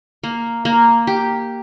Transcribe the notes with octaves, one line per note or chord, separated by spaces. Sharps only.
A#3
A#3
G4